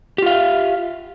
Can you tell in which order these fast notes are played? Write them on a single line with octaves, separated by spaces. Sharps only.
G4 F4 F5 E5